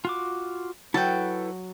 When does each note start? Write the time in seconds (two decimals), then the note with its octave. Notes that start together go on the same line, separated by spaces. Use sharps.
0.05 F4 F#4 D6
0.94 F#3 E4 A4 B4 G5 A5